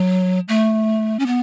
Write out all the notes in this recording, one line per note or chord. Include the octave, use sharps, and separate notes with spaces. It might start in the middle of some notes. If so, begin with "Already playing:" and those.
Already playing: F#3
A3
C#4
B3